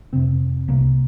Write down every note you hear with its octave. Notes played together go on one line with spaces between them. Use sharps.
F2 C3 C4
C2 C3 A#3